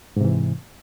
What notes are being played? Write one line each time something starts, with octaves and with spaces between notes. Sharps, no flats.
G#2 C3 E3